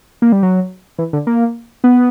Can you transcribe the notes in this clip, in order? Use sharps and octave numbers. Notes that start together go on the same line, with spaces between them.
A#3
G3
F#3
E3
D3
A#3
B3